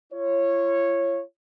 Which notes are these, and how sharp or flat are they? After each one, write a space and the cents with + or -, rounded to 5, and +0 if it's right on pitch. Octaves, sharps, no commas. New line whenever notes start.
F4 -40 C#5 -10